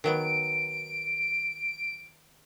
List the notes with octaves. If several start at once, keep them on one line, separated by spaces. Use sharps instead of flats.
D#3 F#3 B3 D7